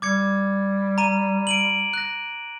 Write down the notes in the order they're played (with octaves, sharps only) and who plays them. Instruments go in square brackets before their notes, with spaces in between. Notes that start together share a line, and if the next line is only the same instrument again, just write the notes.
[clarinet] G3 [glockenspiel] D6 G#6 C#7
[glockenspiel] A#5 D#7
D7 D#7 F#7
F#6 A#6